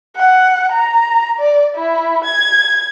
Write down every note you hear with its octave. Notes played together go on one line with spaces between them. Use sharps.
F#5
A#5
D5
E4
G#6